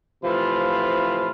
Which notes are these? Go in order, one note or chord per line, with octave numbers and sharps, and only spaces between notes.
A2 C3 E3 F3 F4 B5